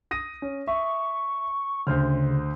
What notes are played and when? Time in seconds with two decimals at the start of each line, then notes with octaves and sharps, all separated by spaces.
0.11 D#6 A#6 D#7
0.42 C#4
0.67 E5 C#6
1.87 D2 C#3 C5 F6